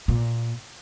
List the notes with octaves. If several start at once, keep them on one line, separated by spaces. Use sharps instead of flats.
A#2